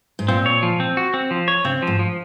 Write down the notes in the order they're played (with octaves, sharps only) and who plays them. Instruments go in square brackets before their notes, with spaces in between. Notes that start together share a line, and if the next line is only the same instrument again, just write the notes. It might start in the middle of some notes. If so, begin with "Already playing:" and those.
[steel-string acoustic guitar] G#2
[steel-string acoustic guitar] A#2 [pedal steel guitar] C4
[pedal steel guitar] C#5
F3
C4
F#4
C4
F3
C#5
[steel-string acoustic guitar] C#3 [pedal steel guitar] C4
[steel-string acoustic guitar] G#2 [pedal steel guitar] F3
[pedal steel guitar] F3